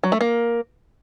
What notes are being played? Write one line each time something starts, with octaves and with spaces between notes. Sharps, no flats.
F#3
A3
A#3